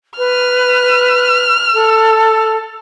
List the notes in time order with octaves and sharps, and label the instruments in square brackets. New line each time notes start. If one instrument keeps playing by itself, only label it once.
[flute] B4 [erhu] F6
[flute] A4